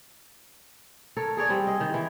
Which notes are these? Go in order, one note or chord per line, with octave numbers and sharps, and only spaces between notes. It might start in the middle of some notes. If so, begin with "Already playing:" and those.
A4 A#4 C#5
G#4 A#4 C#5 D5
G3 C4
G#4 D#5
D#3
D#3 E3